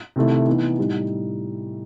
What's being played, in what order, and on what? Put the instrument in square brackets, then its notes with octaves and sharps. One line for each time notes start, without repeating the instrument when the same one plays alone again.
[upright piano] C3 D#3 A3 E4
E3 B3 D#4
A2 G3 D#4